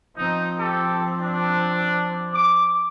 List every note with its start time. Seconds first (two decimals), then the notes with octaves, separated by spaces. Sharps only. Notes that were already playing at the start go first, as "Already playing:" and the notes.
0.16 F3 C4 D#4
0.58 G4 A4
1.19 D4
2.34 D6